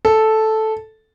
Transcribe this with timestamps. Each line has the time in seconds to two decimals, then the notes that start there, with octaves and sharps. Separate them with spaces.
0.05 A4